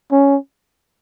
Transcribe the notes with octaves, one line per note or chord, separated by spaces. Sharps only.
C#4